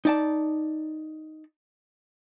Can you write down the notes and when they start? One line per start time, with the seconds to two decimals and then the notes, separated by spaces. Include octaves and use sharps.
0.05 D#4 D5 A5